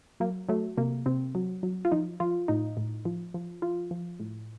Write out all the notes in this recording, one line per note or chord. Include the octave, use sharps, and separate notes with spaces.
F#3 A#3
F#3 A3
C3 A#3
C3 C4
F#3
F#3
F4
F3 D#4
F3 F4
A2 D#4
A2
F3
F3
F3 F4
F3
A2